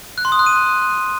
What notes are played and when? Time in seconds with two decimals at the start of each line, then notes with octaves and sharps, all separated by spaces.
0.18 F#6
0.25 C6
0.32 D#6
0.39 F#6
0.46 D#7